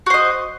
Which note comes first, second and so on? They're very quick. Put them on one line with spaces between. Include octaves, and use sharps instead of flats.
F#4 C5 D#5